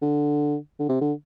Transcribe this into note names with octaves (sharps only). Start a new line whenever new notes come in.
D3
D3
C3
D3